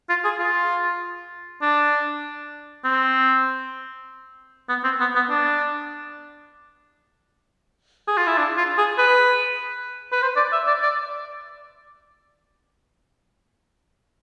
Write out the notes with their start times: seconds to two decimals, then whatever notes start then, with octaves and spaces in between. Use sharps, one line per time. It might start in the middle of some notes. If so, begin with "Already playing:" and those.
0.09 F4
0.24 G#4
0.40 F4
1.62 D4
2.84 C4
4.69 B3
4.84 C4
5.00 B3
5.16 B3
5.30 D4
8.08 G#4
8.17 F4
8.27 E4
8.37 D4
8.57 F4
8.78 G#4
8.98 B4
10.12 B4
10.22 C5
10.36 D5
10.52 E5
10.67 D5
10.82 D5